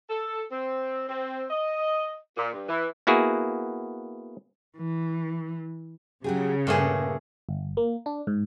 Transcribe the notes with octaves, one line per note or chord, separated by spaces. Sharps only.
A4
C4
C4
D#5
A#2
G2
E3
A#3 B3 E4 F#4 G#4
E3
C#3 F#3 G4 G#4
G2 A#2 A3 G#4
G1
A#3
D4
G#2